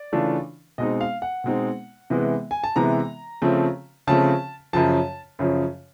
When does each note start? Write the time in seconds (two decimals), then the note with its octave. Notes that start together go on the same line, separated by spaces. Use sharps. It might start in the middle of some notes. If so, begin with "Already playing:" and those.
Already playing: D5
0.12 C#3 E3 A3 D4 F4
0.78 B2 G#3 C4 D#4 D#5
1.01 F5
1.22 F#5
1.44 B2 G#3 C4 D#4
2.10 C3 E3 G#3 B3
2.51 G#5
2.64 A5
2.76 C3 E3 G#3 B3 A#5
3.42 C#3 F3 A3 C4
4.07 C#3 F3 A3 C4 A5
4.73 F#2 C#3 F3 A5
5.39 F#2 C#3 F3